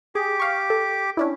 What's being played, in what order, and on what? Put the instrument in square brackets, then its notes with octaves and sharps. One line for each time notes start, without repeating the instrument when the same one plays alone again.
[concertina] G4 D6 [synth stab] G#4
[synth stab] F5 C#6
A4
C#4 D4 E4